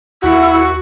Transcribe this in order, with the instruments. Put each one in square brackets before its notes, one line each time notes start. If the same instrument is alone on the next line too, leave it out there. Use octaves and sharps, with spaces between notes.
[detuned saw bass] D#2 [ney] E4 [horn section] F#4